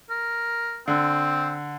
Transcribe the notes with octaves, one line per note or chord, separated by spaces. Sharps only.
A#4
D3 C4